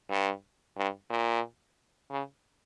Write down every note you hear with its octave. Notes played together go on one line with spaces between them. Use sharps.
G2
G2
A#2
C#3